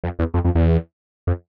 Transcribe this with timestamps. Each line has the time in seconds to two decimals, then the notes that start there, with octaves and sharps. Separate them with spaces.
0.04 F2
0.19 E2
0.34 F2
0.45 F2
0.55 E2
1.27 F2